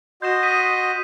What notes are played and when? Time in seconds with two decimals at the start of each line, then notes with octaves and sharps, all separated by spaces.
0.22 F#4 D#5 C6 G6 E7
0.43 D#6 B6 D#7